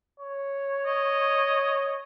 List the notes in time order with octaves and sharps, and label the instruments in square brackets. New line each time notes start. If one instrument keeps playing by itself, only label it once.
[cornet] C#5
[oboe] D#5